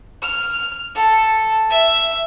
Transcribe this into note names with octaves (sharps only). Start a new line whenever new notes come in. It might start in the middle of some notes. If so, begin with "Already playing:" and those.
F6
A4
E5